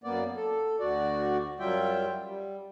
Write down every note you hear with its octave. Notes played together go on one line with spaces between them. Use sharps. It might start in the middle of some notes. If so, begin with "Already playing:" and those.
F#2 A#3 B3 D5
A4
D2 F#4 D5
F#2 F#3 G3 F4 E5 G5
G3